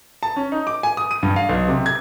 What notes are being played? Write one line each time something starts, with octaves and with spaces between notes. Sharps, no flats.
A5
C#4
D#4
D6
G#5
D#6
D#7
G2
F5
B1
C3
G#6